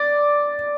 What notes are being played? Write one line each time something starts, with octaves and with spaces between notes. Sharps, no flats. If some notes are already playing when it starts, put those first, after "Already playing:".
Already playing: D5